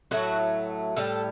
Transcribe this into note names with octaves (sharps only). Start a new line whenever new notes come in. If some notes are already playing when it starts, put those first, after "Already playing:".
A2 F#3 A3 F#4
A2 G3 A4